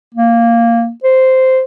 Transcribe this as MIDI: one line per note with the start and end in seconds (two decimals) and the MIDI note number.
0.14 0.91 58
1.04 1.63 72